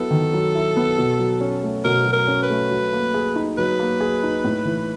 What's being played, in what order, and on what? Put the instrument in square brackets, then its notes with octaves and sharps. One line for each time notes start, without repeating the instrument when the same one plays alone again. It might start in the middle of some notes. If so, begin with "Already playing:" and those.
Already playing: [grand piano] F#3 B3 E4 [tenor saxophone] A4
[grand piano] D#3
F#3
E4
B3
B2
F#3
C#4
A3
[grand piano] B2 [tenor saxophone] A#4
[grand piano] F#3
[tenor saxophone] A#4
[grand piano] C#4
[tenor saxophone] B4
[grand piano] A3
F#3
A#3
G#4
D#4
[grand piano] F#3 [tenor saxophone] B4
[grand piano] A#3
G#4
D#4
A2
E3